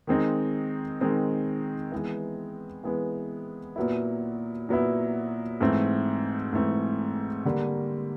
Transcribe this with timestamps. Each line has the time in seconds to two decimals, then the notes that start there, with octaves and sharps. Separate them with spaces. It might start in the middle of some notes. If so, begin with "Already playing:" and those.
0.07 D#3 G#3 C4 D#4
1.00 D#3 G#3 C4 D#4
1.92 E3 G#3 B3
2.84 E3 G#3 B3
3.76 A#2 F#3 B3 E4
4.69 A#2 F#3 B3 E4
5.61 G#2 E3 A3 C4
6.53 G#2 E3 A3 C4
7.45 D3 G3 A#3